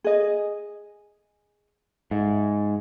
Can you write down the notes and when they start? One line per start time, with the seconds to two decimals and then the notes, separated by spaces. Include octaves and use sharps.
0.04 G#4 D#5
2.11 G#2 E5